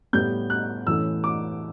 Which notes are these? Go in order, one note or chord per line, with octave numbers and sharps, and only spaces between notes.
A2 G3 B3 G6
F#6
A2 E3 A3 C#4 E6
D6